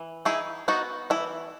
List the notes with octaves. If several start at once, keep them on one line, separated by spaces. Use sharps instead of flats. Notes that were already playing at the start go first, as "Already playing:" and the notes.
Already playing: E3
D#4 E4 G#4
B3 D#4 F#4
E3 E4